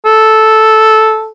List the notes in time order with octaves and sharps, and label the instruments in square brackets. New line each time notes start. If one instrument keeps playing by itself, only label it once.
[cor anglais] A4